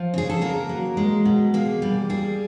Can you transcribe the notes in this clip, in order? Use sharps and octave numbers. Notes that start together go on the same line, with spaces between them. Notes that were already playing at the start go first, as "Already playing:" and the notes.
Already playing: F3
C#3 G#4
A4
A#3 A#4
F#3
G#3
B2
A#3 G#4
G3
G3 G#4